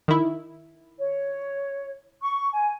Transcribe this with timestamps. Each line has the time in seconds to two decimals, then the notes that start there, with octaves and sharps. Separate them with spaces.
0.08 D#3 E4
0.97 C#5
2.22 C#6
2.53 G#5